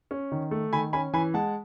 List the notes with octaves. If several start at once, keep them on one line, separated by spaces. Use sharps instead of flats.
C#4
D#3
A3
D#3 G#5 B5
C#4 G#5 B5
E3 G#5 B5
G#3 F#5 A5